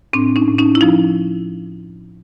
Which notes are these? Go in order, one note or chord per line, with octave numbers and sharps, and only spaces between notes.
A2 C4 D4
C#4 D#4
A2
C#4 D#4
E4
F3 D#4 F4